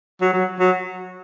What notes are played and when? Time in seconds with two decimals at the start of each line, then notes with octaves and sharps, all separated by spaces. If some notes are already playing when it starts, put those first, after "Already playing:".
0.21 F#3
0.33 F#3
0.60 F#3